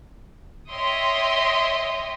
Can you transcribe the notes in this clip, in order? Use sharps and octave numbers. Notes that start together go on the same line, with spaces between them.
C#5 D#5 E5 G5 C6 D#6